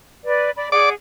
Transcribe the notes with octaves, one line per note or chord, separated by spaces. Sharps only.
B4 D5
D5 B5
G#4 D5 F#5 D6